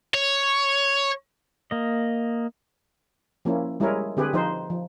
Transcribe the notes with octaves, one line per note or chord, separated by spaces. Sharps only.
C#5
A#3 D#5
F3 A#3 C#4 E4
G3 G#3 E4 G#4 A#4 C#5
D3 C4 G4 G#4 B4
F3 D#4 C5
F3